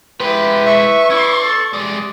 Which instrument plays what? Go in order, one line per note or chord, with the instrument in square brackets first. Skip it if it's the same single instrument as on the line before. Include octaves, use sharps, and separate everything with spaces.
[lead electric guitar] G#3 E4 [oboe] G4 [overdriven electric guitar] B4
[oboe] E5 [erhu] C#6
[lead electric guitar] C#4 D5 [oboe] E4
[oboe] A4
[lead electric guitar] G3 G#3 [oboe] D5